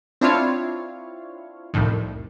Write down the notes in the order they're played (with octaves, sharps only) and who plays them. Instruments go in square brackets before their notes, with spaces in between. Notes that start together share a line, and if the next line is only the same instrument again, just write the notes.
[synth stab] C4 D4 E4 F4 C#5 F5
C2 F2 A2 D#3